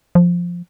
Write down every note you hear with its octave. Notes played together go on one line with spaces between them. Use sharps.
F3